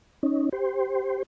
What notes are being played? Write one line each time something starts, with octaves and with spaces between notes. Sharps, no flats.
C#4 D#4
G4 C5